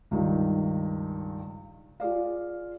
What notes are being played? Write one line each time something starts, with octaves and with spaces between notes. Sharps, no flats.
C#2 G2 D#3
F4 G#4 D5 F5